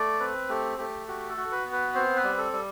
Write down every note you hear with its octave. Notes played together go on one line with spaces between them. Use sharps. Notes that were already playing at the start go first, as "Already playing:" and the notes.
Already playing: A3 D5
C4 B4
A3 G4
A3 G4
F#4 G4
A4
F#4
B4
B3
B4
C4 C5
B4
G3
A4
G3